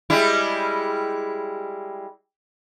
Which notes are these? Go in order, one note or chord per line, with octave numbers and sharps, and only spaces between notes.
G3 G#3 E4